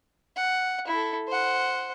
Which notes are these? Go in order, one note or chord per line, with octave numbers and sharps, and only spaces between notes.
F#5
E4 A4
C5 F#5